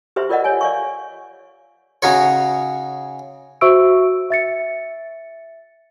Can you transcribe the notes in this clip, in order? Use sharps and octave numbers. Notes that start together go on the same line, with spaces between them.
G4 B4 C5 E5 C6
F4 A#4 D5 D#5 F#5
C#5 G#5
D5 F5 C#6
C#3 D#4 F#4 C#5
F#4 C5 E5 C#6 E6 D7
E5 A6 C#7